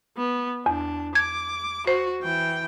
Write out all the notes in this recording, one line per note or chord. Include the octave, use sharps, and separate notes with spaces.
B3
E2 D4
D6 G#6
F#4 C5
E3 G5